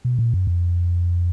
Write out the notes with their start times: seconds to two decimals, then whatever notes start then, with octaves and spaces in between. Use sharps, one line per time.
0.05 B2
0.19 A#2
0.34 F#2
0.47 F2